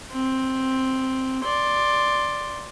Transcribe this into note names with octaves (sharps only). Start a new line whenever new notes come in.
C4
D5 C6